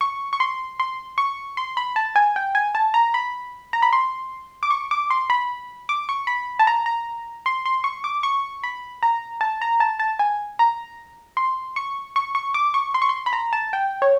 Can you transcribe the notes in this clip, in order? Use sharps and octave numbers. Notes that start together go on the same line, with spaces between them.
C#6
C#6
C6
C6
C#6
C6
B5
A5
G#5
G5
G#5
A5
A#5
B5
A#5
B5
C6
D6
C#6
D6
C6
B5
D6
C#6
B5
A5
A#5
A#5
C6
C6
C#6
D6
C#6
B5
A#5
A5
A#5
A5
A5
G#5
A#5
C6
C#6
C#6
C#6
D6
C#6
C6
C#6
C6
B5
A#5
A5
G5
C#5